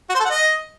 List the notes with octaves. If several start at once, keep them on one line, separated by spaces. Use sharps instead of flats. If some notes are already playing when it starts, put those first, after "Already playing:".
F#4
C5
A4
F#5
D#5